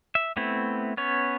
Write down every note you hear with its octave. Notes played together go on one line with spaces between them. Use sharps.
E5
A3 B3 C4 E4
B3 C#4 C#5